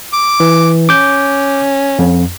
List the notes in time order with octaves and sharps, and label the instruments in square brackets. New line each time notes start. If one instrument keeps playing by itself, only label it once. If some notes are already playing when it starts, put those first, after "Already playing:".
[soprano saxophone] D6
[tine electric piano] E3
[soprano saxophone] C#4 [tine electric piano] D6 G6
[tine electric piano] F2